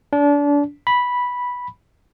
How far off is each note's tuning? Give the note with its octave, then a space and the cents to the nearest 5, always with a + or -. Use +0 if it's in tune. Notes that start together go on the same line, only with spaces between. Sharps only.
D4 -30
B5 -5